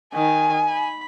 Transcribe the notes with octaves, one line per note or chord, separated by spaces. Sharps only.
D#3 G#5
B5